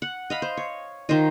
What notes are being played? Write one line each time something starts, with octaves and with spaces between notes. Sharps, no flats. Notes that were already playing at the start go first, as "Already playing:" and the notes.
F#5
D#5 F5 B5
C5
C#5
D#3 F4 C5 D#5